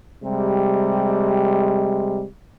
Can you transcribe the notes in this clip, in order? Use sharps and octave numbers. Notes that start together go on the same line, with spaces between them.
C3 G3 G#3